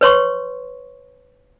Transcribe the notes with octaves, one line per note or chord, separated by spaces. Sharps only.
B4 C#5 C6 C#6